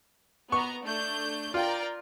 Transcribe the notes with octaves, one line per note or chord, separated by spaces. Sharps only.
B3 A#5 C#6
A3 D4 G6
F4 A#4 D5 G5